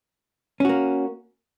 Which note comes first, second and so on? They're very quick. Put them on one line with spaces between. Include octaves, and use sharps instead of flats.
C#4 F#4 A#3